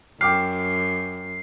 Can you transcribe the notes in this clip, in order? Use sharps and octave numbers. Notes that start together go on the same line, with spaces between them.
F#2 G5 D6 F6 C7